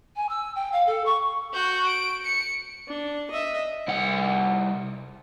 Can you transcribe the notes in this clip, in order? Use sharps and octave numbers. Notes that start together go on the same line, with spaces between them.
G#5
E6
G5
F5
A4
C#6
F#4 G6
D7
C#7
D4
D#5 E5
C2 F#5